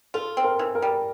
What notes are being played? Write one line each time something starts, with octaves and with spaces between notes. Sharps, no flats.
F4 A4
C4
A#4
E3
A#4
G3